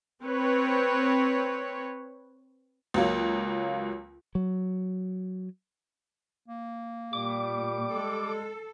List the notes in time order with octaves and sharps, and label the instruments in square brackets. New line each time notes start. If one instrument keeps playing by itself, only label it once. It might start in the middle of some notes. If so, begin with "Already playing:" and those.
[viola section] C4 B4 C#5
[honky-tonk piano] C#2 F#3 A#3
[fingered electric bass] F#3
[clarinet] A#3
[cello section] A#2 [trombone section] G3 [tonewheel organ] D6
[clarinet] G#3 [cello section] A4